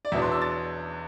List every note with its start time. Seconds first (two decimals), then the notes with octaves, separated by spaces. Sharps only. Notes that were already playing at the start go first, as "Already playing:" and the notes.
0.05 D5
0.12 E2 B2 F#3 B3 D4 E5
0.22 C6
0.28 D6
0.32 E6
0.42 A6